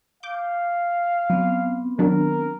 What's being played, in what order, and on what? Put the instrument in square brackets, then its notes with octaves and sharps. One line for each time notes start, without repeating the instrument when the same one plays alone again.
[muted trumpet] F5 [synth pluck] D6 G6
[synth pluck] F#3 [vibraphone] B3 C4
[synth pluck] D#3 F#3 D4 [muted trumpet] A#4